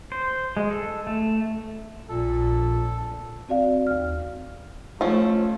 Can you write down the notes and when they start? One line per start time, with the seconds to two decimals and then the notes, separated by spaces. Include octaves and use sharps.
0.12 C5
0.57 G#3
0.71 A4
1.07 A3
2.09 A#1 A#2 A4
3.49 C4 F#4 D5 F5
3.87 D#2 F6
5.01 F3 A3 C#4